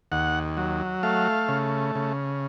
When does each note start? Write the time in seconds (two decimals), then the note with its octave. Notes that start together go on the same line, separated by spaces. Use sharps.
0.12 D#2 F#5
0.57 F#3
1.03 A3 F5
1.48 C#3
1.95 C#3